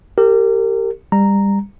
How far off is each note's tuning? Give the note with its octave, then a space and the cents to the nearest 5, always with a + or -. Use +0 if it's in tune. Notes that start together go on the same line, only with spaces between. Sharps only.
G4 +0 A#4 -30
G3 +25 A#5 -5